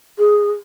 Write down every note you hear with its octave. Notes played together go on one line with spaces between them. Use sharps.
G#4